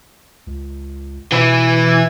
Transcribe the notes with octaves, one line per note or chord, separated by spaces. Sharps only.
C#2
B2 E3 E4